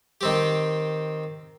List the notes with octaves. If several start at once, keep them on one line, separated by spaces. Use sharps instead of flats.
D#3 C4 G4